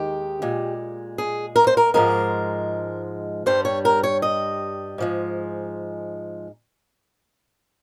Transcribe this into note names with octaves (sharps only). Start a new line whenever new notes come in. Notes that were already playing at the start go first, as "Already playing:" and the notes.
Already playing: D#2 D#3 G#3 G4
A#2 G#3
G#4
A#4
C5
A#4
G#2 F3 G#3 A#4
G2 G3 C5
C#5
A#4
C#5
D#5
G#2 F3 G#3